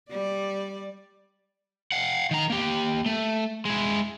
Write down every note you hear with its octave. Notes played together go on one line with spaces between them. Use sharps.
G3 D5
F5 F#5
D#3 A#5
A#3 G4
A3
G#3 E4